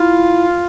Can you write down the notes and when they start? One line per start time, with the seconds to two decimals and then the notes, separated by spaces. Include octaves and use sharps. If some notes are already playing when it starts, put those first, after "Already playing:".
Already playing: E4 F4